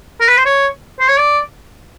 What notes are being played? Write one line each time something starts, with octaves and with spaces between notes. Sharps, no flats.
A#4
B4
C5
C#5
C5
C#5
D5